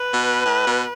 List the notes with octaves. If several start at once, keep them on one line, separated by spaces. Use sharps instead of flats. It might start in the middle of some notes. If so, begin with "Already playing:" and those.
Already playing: B4
B2
A2
B2